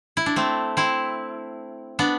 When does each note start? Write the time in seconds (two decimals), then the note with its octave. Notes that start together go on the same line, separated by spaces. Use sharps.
0.17 E4
0.26 D4
0.36 A3 C4
0.77 C4 E4
1.99 B3 D4